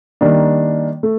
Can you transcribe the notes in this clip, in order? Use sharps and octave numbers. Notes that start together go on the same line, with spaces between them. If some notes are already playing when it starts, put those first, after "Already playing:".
D#3 G3 A#3 D4
A3